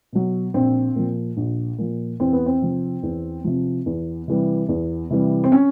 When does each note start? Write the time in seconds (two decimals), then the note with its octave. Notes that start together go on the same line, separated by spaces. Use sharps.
0.13 B2 F#3
0.54 A#1 C4
0.96 A#2 F3
1.37 A#1
1.79 A#2 F3
2.20 E2 C4
2.33 B3
2.46 C4
2.62 C3 F3
3.03 E2
3.44 C3 F3
3.86 E2
4.28 C3 E3 G3
4.69 E2
5.10 C3 E3 G3
5.44 C4
5.52 C#4